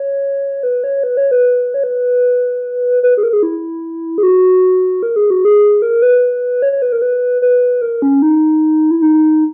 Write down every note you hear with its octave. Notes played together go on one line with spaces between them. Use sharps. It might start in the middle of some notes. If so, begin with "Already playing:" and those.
Already playing: C#5
B4
C#5
B4
C#5
B4
C#5
B4
B4
G#4
A#4
G#4
E4
G#4
F#4
A#4
G#4
F#4
G#4
A#4
B4
C#5
C#5
B4
A#4
B4
B4
A#4
C#4
D#4
E4
D#4